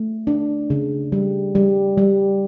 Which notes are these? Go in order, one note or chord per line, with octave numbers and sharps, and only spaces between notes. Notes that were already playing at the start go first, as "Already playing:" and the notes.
Already playing: A3
D4
C#3
G3
G3
G3